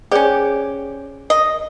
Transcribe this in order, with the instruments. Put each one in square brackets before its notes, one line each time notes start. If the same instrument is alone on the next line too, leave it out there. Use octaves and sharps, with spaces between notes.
[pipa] C#4 G4 [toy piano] G#4 C5 D5
[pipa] D#5